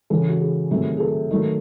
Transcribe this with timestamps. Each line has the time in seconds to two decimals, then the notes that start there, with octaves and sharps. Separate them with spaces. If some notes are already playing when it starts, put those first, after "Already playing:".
0.10 C#3 E3 G#3 A4
0.29 F#4
0.41 G#4
0.71 C3 D#3 F#3 A3 G#4
0.97 G#4
1.00 A4
1.31 D#3 F#3 A3